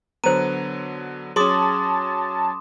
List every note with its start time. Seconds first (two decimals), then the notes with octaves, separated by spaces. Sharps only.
0.24 D3 F#3 B3 C5 A#5 D#7
1.36 F#3 C#4 G#4 A5 C6 D6 D#6